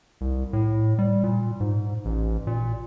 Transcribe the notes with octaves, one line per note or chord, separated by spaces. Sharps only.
C2
A2
G3
A#2
G#2
A1
A#2